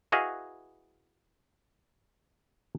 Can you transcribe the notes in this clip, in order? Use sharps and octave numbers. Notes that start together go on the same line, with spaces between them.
E4 F#4 G#4 B4 D#5 F5